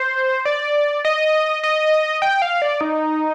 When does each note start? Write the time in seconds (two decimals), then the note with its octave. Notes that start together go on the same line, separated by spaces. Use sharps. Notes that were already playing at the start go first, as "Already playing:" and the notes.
Already playing: C5
0.45 D5
1.05 D#5
1.64 D#5
2.22 G5
2.42 F5
2.62 D5
2.81 D#4